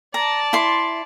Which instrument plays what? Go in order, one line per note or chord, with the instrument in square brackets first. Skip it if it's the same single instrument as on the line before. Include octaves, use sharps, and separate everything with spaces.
[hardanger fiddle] D5 A5 [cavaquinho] A#5
[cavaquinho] E4 C6